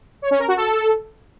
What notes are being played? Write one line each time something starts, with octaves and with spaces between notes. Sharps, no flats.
C#5
C#4
A#4
F#4
A4